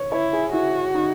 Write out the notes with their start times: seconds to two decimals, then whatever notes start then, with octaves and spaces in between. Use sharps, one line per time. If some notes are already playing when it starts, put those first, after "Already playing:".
Already playing: C#5
0.12 E4 C#5
0.33 G#4
0.53 E4 F#4
0.94 D#4